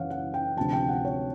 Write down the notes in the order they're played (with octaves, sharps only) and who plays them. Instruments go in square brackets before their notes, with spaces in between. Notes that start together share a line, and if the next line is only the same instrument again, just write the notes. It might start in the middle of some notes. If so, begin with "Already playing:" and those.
Already playing: [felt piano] F#2 C#3 E3 C#5 F5 F#5
F#5
G5
D2 C3 F3 A5
G5
F#5
C#5